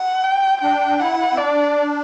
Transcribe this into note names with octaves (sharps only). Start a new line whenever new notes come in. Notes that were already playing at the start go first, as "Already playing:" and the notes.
Already playing: F#5
G5
D4 G5
E4 F#5
C4
D4 D5